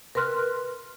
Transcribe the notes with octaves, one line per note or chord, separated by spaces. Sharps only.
A#4 B4 C6 F6 F#6